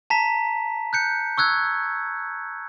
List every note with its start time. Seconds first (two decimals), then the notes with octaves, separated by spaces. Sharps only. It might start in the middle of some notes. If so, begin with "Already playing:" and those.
0.10 A5 A#5 B6
0.93 F#6 G6 C#7
1.38 C#6 E6 F#6 G#6